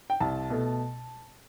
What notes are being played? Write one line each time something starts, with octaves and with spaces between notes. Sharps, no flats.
G5
C2 A5
B2 A3